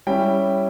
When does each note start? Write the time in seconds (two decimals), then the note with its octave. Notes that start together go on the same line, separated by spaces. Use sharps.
0.07 G3 C#4 E4 G5